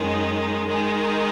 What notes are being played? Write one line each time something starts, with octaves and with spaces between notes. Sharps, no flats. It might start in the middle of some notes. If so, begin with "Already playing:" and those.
Already playing: F#2 D#3 G#3 D#4
D#3 G#3 D#4